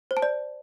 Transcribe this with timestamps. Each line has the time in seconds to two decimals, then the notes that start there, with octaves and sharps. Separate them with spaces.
0.11 C5
0.17 A5
0.22 D5